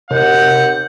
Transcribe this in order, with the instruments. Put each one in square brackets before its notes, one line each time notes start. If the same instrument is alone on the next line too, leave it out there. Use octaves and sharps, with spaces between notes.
[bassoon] D#2 [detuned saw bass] C3 [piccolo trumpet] F#5 [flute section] G6